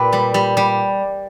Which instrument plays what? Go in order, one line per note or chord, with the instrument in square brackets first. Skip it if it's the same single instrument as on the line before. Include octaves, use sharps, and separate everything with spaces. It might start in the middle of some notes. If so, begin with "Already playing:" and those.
Already playing: [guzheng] A#2 G4 B4 D5
G3
G3
G3